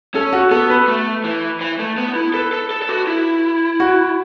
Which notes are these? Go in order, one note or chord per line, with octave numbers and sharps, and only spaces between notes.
C#4 A4
F#4
B3 A4
B4
A3
E3
E3
A3
B3
E4
A4 B4
A4
A4
A4
F#4
E4
F#4